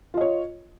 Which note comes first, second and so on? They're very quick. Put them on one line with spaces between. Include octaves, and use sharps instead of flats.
F4 D#5 C#5